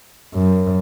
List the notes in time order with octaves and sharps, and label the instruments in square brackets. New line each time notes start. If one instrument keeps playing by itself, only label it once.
[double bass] F#2